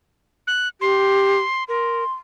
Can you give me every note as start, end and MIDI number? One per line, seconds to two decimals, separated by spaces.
0.47 0.68 90
0.81 1.39 67
0.81 1.64 84
1.69 2.04 70
1.69 2.13 84